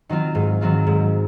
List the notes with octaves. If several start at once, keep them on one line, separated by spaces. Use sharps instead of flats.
D#3 F#3 C4 F4
G#2
D#3 F#3 C4 F4
G#2